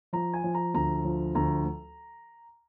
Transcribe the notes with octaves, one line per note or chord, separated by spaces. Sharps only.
F3 A#5
G#5
F3
A#5
D2 A#5
F3
D2 A#5